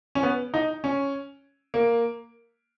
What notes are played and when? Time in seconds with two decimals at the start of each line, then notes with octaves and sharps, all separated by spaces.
0.15 C#4
0.23 B3
0.54 D#4
0.84 C#4
1.74 A#3